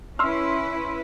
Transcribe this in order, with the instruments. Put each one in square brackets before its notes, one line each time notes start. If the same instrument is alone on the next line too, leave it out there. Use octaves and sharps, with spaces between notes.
[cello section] C#4 E4 B4 [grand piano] C6 E6 F6